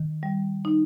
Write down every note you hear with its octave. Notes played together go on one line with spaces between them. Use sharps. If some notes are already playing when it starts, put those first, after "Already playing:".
Already playing: D#3
G3
D#4